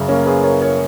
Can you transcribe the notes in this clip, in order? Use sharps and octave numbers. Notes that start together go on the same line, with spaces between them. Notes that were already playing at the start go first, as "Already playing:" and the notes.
Already playing: F#2 C#3
A#3 C#4
G#4 B4
A#4 C#5
A#4 C#5